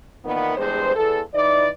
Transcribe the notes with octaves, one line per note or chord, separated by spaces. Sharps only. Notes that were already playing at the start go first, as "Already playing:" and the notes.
A#2 D#3 E3 B3
E2 G2 G#3 C5
E2 A4
E3 D#4 E4 D5